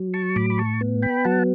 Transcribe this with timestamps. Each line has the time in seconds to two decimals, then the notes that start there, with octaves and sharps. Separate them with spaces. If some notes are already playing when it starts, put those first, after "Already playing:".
Already playing: F#3
0.14 A5 C#6
0.36 A2 B5 D6
0.50 B5
0.58 A5 C#6
0.81 B3
1.02 G5 B5
1.25 F#3 F#5 A5